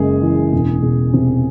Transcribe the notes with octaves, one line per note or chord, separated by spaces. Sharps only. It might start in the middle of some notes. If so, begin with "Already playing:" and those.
Already playing: F#1 G#3 G#4
E3
E1
E1
C3